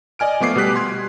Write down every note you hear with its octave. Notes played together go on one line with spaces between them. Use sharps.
D5 D#5 G#5 F6 D7
F3 A3 B3 D6 C7
B2 G3 G4 F#6 B6
C6 G#6